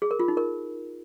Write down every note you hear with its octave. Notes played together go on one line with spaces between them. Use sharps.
G#4
A#4
F4
D#4
A#4